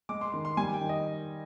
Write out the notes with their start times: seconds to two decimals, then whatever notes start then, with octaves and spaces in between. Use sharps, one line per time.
0.09 G#3 D6
0.21 C6
0.32 D#3 C6
0.45 C6
0.57 G3 G#5
0.74 G5
0.81 D#3
0.89 D#5